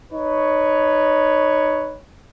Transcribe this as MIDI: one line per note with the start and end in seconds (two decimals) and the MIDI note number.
0.12 1.98 63
0.12 1.98 71
0.12 1.98 73